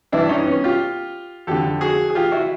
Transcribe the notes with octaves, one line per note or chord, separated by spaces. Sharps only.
G2 E3 D4 E4
C#4 D#4
B3 C#4
F4 G4
F2 D3 G4 A4
F#4 G#4
G#4
F4 G4
E4 F#4